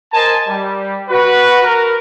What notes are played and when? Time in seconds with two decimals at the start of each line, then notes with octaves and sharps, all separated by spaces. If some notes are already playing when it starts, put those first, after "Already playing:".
0.13 A#4 C5 D#5 G#5 A5
0.48 G3
1.09 F#4 B4
1.64 A#4